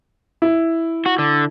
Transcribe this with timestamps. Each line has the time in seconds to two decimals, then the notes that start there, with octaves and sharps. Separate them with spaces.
0.42 E4
1.06 F#4
1.19 D3